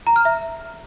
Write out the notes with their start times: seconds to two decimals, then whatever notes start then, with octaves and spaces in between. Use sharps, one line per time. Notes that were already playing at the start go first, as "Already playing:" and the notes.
0.07 A#5
0.16 F6
0.25 E5